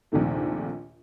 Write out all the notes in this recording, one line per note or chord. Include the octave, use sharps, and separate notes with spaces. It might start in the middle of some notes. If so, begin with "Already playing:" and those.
A#1 D#2 C3 D#3 A3